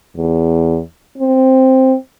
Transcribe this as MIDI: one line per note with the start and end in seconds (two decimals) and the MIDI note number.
0.16 0.80 40
1.18 1.95 60